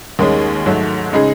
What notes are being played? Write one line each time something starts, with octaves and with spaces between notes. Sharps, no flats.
D#2 D#3 G#3 C#4 G#4
G#2 F#3 A3
C#3 G#3 D#4 G#4